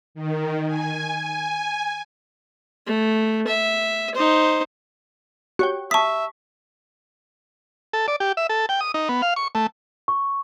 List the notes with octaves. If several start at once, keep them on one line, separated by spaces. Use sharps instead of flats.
D#3
G#5
G#5
A3
E5
D#4 C5
F#4 G4 C#5 G5
E5 A5 C#6 D#6 B6
A4
D5
G4
E5
A4
G5
D#6
D#4
B3
F5
C#6
A3
C#6